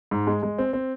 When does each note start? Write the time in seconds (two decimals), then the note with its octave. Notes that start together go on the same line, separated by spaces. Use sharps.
0.11 G#2
0.27 G#3
0.43 G#3
0.58 C4
0.73 C4